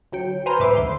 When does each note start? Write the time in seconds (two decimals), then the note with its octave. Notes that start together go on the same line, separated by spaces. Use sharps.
0.12 D2 F#3 G5 C#7
0.46 B4 C5 G#5 A#5 F6 G6
0.59 C2 G#2 B4 E5 D6 C7
0.75 D2 D3 C6